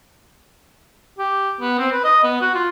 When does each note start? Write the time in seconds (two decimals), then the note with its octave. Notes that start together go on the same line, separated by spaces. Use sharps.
1.19 G4
1.60 B3
1.79 C4
1.92 B4
2.04 D#5
2.23 B3
2.41 F#4
2.55 F4